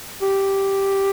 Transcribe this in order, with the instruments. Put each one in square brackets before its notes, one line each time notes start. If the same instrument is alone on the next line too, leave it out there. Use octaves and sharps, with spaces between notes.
[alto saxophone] G4